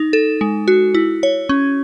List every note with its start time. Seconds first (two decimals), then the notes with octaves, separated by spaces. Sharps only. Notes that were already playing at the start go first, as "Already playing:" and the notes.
Already playing: D#4
0.13 A4
0.41 G#3
0.68 F#4
0.95 E4
1.23 C#5
1.49 C#4